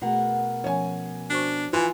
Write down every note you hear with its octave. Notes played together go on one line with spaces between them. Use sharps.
B2 A3 G#4 A#4 F#5
F3 C#4 C#5 G#5
D4 F#4 C5 C#6
E3 F4 G#5 C6